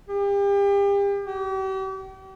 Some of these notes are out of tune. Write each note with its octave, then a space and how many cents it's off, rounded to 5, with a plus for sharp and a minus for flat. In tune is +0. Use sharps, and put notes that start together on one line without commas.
G4 +35
G4 -40